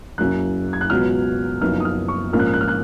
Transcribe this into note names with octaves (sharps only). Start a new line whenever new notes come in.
F#1 F#2 C#3 F#6
G#6
F#6
C#2 B2 F#3 B3 F6
F#1 F#2 F3 B3 D#4 F6
D#6
F6
C#6
A#1 G#2 F3 A#3 C#4 F6
F#6
F6
F#6
F6
F#6